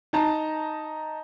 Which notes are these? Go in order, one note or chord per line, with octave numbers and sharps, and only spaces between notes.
D#4 A5 A#5